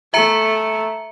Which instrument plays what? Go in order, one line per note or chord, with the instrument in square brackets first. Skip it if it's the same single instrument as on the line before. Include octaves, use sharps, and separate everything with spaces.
[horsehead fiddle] A3 [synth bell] E5 A#5 C#7